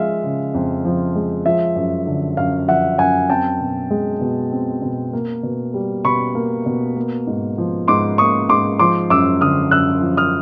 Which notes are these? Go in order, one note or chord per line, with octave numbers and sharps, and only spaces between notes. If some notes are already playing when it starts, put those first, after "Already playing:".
Already playing: F3 G#3 E5 F5
C#3
F2
F3
G#3
F3 E5
F#2
D3
F#2 F5
F3 E5 F#5
F#2 F#5 G#5
C4 G5 A5
B2
G#3
B2
C4
B2
A#3
B2
G3
B2 B5 C#6
A#3
B2
A#3
G#2
F3
G#2 C6 D6
A#3 C#6 D#6
G#2 C6 D6
F3 C6 D6
F#2 D6 E6
D3 D#6 F6
F#2 E6 F#6
F3
D#6 F6